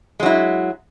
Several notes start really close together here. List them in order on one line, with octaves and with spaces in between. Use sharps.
G#3 F#3 E4